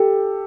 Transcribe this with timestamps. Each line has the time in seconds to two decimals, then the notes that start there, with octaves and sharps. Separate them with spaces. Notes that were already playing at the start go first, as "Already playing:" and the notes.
Already playing: G4 A4